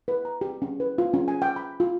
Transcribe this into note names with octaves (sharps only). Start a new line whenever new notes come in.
B4
A#5
G4
C#4
B4
F4
C#4
G#5
G5
B5
F4